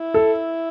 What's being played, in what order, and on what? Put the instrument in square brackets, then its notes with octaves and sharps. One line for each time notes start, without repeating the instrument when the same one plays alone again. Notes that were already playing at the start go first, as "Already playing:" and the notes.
Already playing: [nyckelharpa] E4
[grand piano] A4